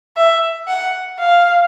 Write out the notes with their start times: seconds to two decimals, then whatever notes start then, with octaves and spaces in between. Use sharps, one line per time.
0.17 E5
0.68 F#5
1.19 F5